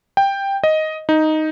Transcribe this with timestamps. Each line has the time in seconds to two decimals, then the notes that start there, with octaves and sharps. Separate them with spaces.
0.17 G5
0.64 D#5
1.09 D#4